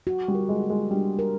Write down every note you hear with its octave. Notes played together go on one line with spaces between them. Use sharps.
F#4
G3
A#4
G#3
A#3
G#3
G3 D4
A#4